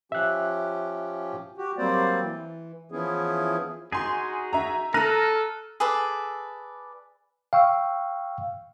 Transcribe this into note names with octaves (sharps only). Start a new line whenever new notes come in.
F3 C#4 G4 E5 F#6
F#4 G4
F#3 G3 A#3 C4 C5 D5
E3
E3 F3 B3 C#4 E4 G#4
D#4 F#4 G#4 G#5 C6
E5 A#5
A4 A#5 F6 F#6 D#7
G#4 A4 B4 D5
F5 G5 C#6 E6